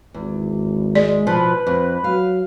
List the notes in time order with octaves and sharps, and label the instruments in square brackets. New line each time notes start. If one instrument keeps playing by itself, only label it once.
[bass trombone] G#1 [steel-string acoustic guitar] E2
[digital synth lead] G#3 [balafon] D5
[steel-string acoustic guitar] B2 F3 [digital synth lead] B4
[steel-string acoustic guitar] F2
[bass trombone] F#3 [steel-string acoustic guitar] F5